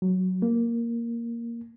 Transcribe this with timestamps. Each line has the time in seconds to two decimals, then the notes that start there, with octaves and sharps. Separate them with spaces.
0.02 F#3
0.42 A#3